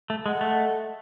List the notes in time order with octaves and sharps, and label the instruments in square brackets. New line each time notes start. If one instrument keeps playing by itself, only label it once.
[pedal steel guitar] A3
[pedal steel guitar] G#3 [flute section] A4 D#5 F#5
[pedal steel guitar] A3